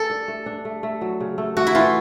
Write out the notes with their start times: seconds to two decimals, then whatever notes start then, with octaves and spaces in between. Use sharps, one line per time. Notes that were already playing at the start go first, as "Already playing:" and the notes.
Already playing: A4
0.10 D4
0.28 A3
0.46 D4
0.65 A3
0.83 A3
1.01 F#3
1.20 C#3
1.38 A3
1.57 A3 F#4
1.67 E4
1.75 E3 F4